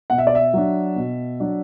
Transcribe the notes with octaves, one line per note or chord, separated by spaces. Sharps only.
B2 F#5
E5
D5
E5
F#3 D4
B2
F#3 D4